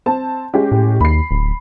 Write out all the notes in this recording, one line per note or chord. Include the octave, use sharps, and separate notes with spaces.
C4 A5
G#3 C#4 G4
A2
D#2 B5 C7
D1